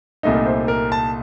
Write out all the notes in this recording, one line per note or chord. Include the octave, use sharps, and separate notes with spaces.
C2 A#2 A3 D#4 D#5
C5
A#4
A5